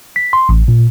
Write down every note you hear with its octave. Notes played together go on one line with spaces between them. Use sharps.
B6
C6
A1
A#2